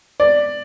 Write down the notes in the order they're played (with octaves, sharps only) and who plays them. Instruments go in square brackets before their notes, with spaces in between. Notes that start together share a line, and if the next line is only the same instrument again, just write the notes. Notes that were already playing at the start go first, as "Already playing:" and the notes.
[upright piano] D5